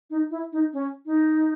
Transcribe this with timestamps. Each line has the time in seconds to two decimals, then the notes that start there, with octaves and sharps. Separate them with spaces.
0.10 D#4
0.31 E4
0.52 D#4
0.73 C#4
1.06 D#4